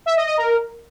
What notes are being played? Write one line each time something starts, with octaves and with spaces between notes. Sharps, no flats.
E5
D#5
D#5
A#4